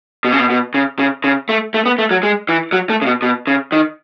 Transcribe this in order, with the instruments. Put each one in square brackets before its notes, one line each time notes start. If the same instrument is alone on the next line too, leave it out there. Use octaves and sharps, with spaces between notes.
[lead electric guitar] B2
C#3
B2
B2
C#3
C#3
C#3
A3
A3
B3
A3
F#3
G#3
E3
F#3
A3
C#3
B2
B2
C#3
D#3